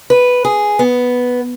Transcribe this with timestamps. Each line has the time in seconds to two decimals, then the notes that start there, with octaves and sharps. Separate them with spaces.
0.10 B4
0.45 G#4
0.79 B3